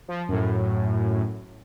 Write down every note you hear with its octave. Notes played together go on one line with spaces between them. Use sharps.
F3
F#2 A2